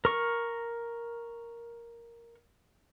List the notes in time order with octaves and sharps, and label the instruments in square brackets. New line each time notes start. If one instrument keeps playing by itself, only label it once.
[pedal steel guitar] A#4 C#6